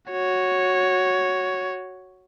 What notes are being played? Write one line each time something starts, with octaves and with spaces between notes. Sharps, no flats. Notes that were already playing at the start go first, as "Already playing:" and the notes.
F#4 C#5